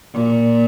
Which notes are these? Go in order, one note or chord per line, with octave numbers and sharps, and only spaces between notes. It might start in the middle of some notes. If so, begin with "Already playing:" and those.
A#2